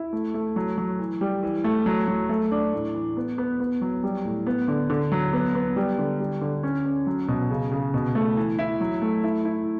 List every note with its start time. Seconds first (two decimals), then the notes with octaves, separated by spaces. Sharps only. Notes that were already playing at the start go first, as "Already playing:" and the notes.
Already playing: E4
0.13 A3
0.34 A3
0.56 F#3
0.78 F#3
0.99 E3
1.21 G3
1.43 E3
1.64 A3
1.86 F#3
2.08 F#3
2.29 A3
2.51 D4
2.74 A2
2.94 E3
3.17 B3
3.38 B3
3.60 B3
3.81 F#3
4.03 G3
4.25 A2
4.47 B3
4.68 D3
4.90 D3
5.12 F#3
5.33 B3
5.55 B3
5.76 G3
5.98 D3
6.20 G3
6.41 D3
6.63 C#4
6.85 C#4
7.07 F#3
7.28 B2
7.50 C#3
7.71 C#3
7.94 B2
8.15 A3
8.37 E3
8.59 E4
8.81 F#3
9.02 A3
9.24 E4
9.45 E4